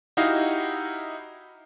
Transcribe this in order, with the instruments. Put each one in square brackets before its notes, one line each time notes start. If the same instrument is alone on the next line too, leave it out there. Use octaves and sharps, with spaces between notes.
[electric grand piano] D#4 E4 F#4 G4 D#5 F5